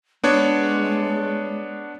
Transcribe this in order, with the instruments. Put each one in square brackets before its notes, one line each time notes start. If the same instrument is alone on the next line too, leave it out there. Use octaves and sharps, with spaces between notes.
[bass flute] G#3 [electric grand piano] B3 D4 C#5